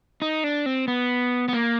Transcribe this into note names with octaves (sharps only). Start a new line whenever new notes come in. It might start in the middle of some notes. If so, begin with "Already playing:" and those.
D#4
D4
C4
B3
B3
A#3